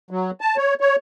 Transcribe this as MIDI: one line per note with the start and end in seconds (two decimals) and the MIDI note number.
0.11 0.31 54
0.41 0.56 81
0.57 0.74 73
0.81 0.96 73